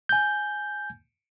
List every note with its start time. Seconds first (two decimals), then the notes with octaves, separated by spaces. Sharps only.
0.09 G#5 G6